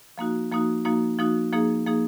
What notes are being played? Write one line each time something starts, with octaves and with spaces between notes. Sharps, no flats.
F3 A#3 D#4 F#4
F3 A#3 D#4 F#4
F3 A#3 D#4 F#4
F3 A#3 D#4 F#4
F3 A#3 D#4 G#4
F3 A#3 D#4 G#4